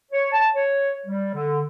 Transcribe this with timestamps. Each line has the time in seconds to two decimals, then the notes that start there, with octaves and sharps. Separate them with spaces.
0.12 C#5
0.32 A5
0.55 C#5
1.07 G3
1.33 D3